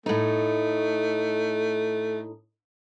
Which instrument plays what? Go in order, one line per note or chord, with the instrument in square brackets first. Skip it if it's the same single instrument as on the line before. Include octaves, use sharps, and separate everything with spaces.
[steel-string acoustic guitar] A2 D#4 [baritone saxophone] A3